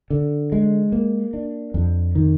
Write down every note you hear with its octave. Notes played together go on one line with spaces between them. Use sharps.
D3
G#3
A#3
D4
F2
D#3